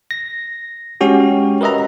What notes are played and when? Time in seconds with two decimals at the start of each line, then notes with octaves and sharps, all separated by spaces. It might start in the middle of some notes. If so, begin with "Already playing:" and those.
0.11 A#6
1.01 G#3 C#4 F#4 G4
1.61 A#4 B4 D#5 E5 A#5